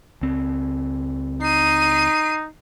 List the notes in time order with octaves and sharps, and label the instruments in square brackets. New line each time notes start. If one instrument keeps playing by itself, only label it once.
[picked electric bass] C#2 C4
[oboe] D#4 [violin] C7 D#7